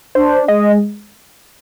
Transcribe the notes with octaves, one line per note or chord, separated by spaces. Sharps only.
D4 C5
G#3 D#5